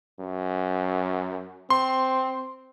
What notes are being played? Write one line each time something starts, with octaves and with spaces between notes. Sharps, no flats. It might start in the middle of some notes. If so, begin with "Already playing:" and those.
F#2
C4 C6